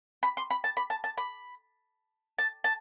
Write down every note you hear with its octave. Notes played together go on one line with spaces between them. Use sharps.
B5
C6
B5
A5
B5
A5
A5
B5
A5
A5